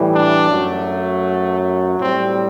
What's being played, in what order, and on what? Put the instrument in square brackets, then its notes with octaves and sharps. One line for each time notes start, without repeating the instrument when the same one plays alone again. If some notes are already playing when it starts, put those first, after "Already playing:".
Already playing: [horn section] A2 E3 G3
D4
F#2 F#3 A3
A2 C4
G3